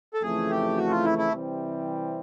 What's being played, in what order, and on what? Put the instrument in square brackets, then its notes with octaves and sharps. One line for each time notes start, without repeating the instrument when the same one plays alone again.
[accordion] A4
[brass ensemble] F2 C#3 E3 A3 [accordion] G#4
[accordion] G4
F#4
F4
E4
E4
[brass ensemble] C3 E3 G3 C4